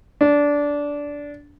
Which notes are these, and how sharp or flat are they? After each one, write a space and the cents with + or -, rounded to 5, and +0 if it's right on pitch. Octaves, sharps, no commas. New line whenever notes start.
D4 -15